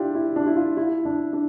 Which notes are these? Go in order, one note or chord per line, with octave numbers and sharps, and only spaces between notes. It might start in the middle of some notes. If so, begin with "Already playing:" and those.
Already playing: D4 E4 F4 G4
E4
D4
E4
F4
E4
D4
D4